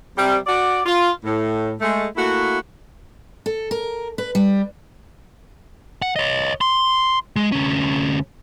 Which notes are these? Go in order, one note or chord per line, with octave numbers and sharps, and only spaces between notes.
C3 G3
F#4 D5
F4
A2
G#3 A3
A3 A#3 E4 F#4
A4
A#4
B4
G3
F#5
C#5 D#5
C6
G#3
D2 C#4